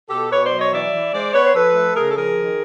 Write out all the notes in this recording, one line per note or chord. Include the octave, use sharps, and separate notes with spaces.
B2 G4 A4
B2 B4 C#5
C5 D5
F#3
C#5 D#5
E3 D5 E5
E3
G#3 C5 D5
B3 B4 C#5
C5
F3 A4 B4
A3
C#3 G#4 A#4
A4
F3 G#4 A#4
D#3